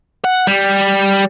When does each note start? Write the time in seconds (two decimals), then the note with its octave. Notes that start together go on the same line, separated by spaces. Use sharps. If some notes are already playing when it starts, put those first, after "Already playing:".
0.25 F#5
0.47 G3